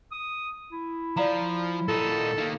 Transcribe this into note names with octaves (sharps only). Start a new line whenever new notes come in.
D#6
E4
F3 D5 F5 A#5
A#2 D#4 A4
D#3 A#3